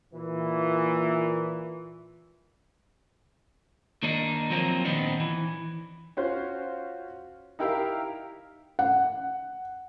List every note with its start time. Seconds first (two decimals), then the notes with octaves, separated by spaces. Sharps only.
0.14 A#2 E3
4.03 D#3 A#3 D4 D#4
4.50 F3 F#3 A#3 C4 A#4
4.85 A#2 D#3 B3 C4 D4 D#4
5.20 E3
6.17 C#4 F4 F#4 C5
7.59 D#4 E4 G4 A#4 E5 F5
8.79 F#5